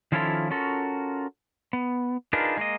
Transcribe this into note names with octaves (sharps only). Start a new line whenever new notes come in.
D#3 F3 C#4 E4 F4 A4
C#4 F4 F#4 A4 A#4
B3
D4 D#4 F4 G#4 A#4 B4
G#3 A#3 D#5